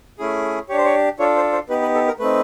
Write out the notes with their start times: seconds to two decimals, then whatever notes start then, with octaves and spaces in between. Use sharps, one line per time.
0.19 A3 C#4 E4 G#4
0.69 D4 G4 C#5
0.77 C5
0.85 C#5
1.19 D4 F4 A4 C#5
1.36 C5
1.52 C5
1.69 B3 D#4 G4 B4
1.82 B4
1.95 A4
2.07 A#4
2.19 A3 C4 D#4 B4